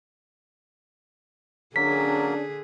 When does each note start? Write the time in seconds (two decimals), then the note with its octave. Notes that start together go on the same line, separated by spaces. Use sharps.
1.76 D3 F#3 A#3 C#4 D4 G#4 A#4 B6